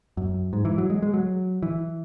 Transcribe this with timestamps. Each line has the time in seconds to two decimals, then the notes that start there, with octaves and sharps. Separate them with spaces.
0.17 F#2
0.53 G#2
0.65 E3
0.78 F#3
0.90 G#3
1.02 G#3
1.14 F#3
1.63 E3